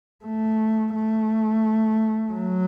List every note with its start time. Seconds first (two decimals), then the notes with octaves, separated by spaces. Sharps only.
0.25 A3
0.95 A3
2.34 F#3